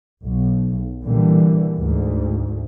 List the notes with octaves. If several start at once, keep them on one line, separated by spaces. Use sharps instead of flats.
B1
A#2 D3 E3 G3
D2 G#2